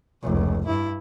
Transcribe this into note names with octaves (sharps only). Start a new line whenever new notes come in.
F1 C#2
G2 E4